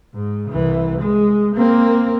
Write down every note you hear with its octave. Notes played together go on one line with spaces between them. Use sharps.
G#2
C2 E3
G#3
A#3 C4